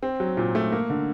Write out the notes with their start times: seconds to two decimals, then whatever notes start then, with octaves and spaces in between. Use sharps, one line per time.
0.03 C4
0.20 F#3
0.37 A#2
0.55 A3
0.72 A#3
0.90 D3